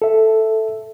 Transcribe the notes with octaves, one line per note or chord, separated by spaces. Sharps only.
A4 E5